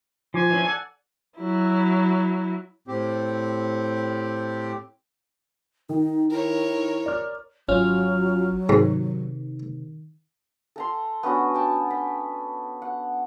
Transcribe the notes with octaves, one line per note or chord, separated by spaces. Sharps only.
F3 F4 G#5 D6
E3 F3 C#4
A4 D5 F#5
F#3 E4
A2 C4 G4
D#3 D#4
E4 A#4 C#5
D5 F6
G#1 F#3 C#4 F4 F6
G#2 C3 D#3
A4 A#5 C6
B3 C#4 D4 F#4
G5 A5
B5
F#5